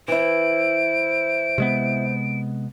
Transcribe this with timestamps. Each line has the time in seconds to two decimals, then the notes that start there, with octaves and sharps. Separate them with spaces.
0.08 E3 E4 C5 D7
1.58 C3 G#3 B3